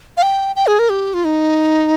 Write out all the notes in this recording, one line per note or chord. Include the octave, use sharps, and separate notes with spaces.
F5
G5
G5
G#4
A#4
G4
F4
D#4